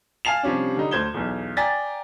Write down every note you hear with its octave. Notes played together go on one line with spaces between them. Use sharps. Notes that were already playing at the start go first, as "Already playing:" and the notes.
F5 G#5 A5 C7 F7
C3 F3 G3 C#4 D4
D3 G3 D#4
D2 C5 G6 G#6 E7 G7
B1 E2
D5 G5 G#5 A#5 A6 B6